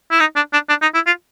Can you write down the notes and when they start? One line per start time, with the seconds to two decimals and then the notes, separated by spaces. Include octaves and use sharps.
0.11 E4
0.20 D#4
0.36 D4
0.53 D4
0.69 D4
0.82 D#4
0.95 E4
1.07 F4